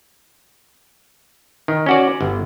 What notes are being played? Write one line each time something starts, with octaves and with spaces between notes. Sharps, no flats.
D#3
C#4 F#4 D5
G1